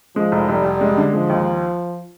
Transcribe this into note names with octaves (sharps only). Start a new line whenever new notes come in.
F3 G#3
F1
F1 G3
F1
G#3
D3
F3 G#3
D#2